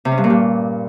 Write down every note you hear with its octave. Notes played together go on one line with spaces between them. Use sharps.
C3
C#4
G2
A#2
G2